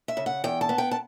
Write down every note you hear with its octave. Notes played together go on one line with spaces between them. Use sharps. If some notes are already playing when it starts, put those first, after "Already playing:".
E5
C#3
F#5
E2 G5
A5
B3
G5
A5